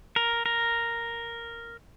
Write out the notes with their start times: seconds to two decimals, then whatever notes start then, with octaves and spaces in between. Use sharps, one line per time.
0.16 A#4
0.46 A#4